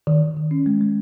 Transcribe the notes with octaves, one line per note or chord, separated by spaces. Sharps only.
D#3
D#3
D#3
C#4
G#3
G#3